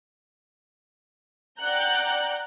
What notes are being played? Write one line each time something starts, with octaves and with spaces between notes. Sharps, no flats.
D5 F#5 G5 A#5 F#6 G6